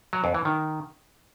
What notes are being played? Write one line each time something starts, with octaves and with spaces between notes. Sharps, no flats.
F#3
F2
E3
D#3